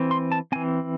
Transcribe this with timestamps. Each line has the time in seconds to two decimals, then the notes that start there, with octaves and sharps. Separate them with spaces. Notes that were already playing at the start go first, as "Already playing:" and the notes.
Already playing: E3 C4
0.11 C6
0.32 A5
0.52 E3 C4 G#5